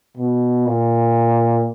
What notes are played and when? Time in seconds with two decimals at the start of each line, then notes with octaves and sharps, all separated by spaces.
0.17 B2
0.66 A#2